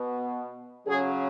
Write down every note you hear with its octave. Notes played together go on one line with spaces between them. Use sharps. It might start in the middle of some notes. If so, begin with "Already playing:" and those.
Already playing: B2 B3
C#3 F#3 C#4 G#4